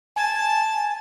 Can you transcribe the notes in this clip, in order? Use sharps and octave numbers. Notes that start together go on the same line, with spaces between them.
G#5 A5